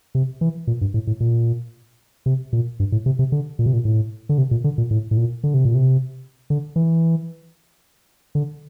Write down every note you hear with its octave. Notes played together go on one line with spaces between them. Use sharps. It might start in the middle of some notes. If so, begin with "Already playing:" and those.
C3
E3
A#2
G2
A2
A2
A#2
C3
A#2
G2
A2
C3
C3
D3
A#2
C3
A#2
A2
D3
C3
A#2
D3
A#2
A2
A2
A#2
D3
C3
A#2
C3
D3
E3
D3